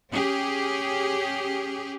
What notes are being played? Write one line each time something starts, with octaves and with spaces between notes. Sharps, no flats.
C#4 G4 G#4